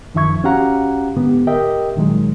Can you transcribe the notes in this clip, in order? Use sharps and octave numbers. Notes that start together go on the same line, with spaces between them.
F#2 D#3 F3 E5 C#6 G#6
C#4 F#4 G4 F5 F#5 A#5
G#2 D3 B3 G4
G4 A#4 D#5 E5 G5
A#2 D#3 F#3 G#3